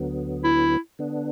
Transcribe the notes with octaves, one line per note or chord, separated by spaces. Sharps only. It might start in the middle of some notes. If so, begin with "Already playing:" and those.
Already playing: D2 D3 F#3 B3
E4
D3 B3 D4